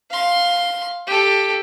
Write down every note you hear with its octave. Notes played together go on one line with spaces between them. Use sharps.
F5 C6
G4 A4